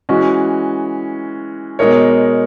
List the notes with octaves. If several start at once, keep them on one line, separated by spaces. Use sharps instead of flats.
E3 G#3 C#4 F#4
B2 G#3 D#4 A#4 C#5